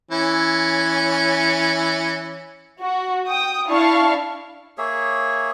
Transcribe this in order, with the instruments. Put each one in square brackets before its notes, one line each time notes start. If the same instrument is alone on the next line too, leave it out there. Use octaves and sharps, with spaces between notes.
[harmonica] E3 C#4
[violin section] F#4
G5 D#6
D4 E4 F5 A5 C#6
[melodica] A#3 G#4 C#5 E5